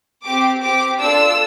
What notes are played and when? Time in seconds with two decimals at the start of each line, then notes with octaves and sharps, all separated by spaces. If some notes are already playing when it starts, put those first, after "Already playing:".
0.25 C4 G4 D6
0.62 C4 G4 D6
0.99 D4 F4 A4 E6